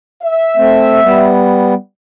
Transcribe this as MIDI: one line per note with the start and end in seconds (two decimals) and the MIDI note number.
0.23 1.39 76
0.57 1.00 57
0.57 1.00 60
1.02 1.74 55
1.02 1.74 59